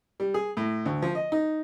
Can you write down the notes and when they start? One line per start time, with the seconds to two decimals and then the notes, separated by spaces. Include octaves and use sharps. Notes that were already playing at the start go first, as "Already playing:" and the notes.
0.20 G3
0.34 G#4
0.57 A2
0.86 D2
1.02 F3
1.15 D#5
1.32 D#4